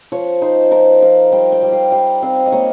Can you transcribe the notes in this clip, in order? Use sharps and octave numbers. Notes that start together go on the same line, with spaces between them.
F3 C#5
D#4 C5
F3 A#4
F3 F5
G3 G5
G5
G3
F5
G3 F5
C4 F5
D#5
A#3 C#5